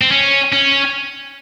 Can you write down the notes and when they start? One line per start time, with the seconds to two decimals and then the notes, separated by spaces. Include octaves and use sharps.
0.02 C4
0.12 C#4
0.53 C#4